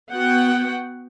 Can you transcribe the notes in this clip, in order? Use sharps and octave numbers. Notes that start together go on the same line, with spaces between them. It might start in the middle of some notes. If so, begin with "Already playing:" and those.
B3 F#4 F#5 G5